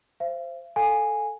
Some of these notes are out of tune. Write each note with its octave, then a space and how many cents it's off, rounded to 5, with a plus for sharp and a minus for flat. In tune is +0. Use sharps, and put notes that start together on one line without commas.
C5 +0 F5 -45
A4 +0 F5 +30 G#5 -5